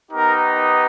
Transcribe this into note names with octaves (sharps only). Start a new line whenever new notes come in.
B3 D#4 G4 A#4